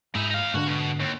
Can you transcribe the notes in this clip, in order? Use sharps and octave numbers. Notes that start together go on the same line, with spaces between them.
G#2 D#4 E4
D#4 F5
G#2 D3 D4 F#4
B2
D#2